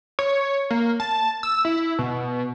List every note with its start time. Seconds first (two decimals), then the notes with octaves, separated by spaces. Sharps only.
0.19 C#5
0.71 A#3
1.00 A5
1.43 E6
1.65 E4
1.99 B2